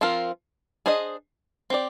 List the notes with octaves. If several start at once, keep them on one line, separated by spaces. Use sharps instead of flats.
F3 C4 F4 A#4
D4 G#4 C5 D#5
C4 G4 D5